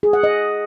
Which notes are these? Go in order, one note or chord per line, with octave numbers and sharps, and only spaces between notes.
G#4
F#5
D#5